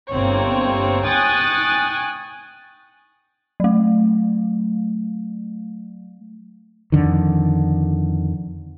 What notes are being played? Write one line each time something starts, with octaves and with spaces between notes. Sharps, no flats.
G1 C3 A#3 C4 C#5
G5 G#5 C#6 D#6 F#6 A6
F#3 A3
F2 D3 D#3